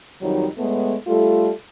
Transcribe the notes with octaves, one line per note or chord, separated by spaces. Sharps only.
F2 D#3 F#3 G3 D#4
A2 G#3 A3 B3
G3 A3 F4 A4